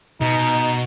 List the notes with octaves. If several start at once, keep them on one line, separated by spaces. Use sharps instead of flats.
B2 D#4